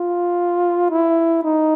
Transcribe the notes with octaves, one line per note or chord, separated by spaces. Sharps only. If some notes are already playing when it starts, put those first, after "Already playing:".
Already playing: F4
E4
D#4